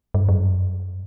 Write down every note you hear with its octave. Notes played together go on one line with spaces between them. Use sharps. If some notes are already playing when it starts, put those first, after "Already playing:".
G2
F#2